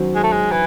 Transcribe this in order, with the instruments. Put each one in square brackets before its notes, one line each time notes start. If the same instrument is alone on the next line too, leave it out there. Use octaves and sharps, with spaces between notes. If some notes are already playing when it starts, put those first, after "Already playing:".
Already playing: [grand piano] D#3 F#3 C#4 F#4 C5
[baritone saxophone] G#3
A3
G#3
E3